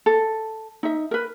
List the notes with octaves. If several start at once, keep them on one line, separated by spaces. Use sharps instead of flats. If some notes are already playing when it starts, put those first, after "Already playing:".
A4
D#4 E5
A#4 B4